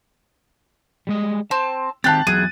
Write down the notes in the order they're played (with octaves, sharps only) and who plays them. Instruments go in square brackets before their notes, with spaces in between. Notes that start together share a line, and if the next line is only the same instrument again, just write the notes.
[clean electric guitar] G3 G#3 D#5
[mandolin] C4 [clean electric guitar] A5
[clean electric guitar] D#3 C4 [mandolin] G4 F5 [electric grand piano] A5 F#6 A6
[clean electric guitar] E2 F#3 E5 [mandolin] G#4 [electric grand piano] D#7